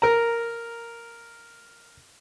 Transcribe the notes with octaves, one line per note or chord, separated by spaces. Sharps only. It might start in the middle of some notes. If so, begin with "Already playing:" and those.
A#4 A#5